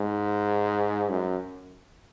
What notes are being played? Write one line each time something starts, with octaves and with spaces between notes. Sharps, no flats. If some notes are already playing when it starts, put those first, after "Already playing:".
Already playing: G#2
F#2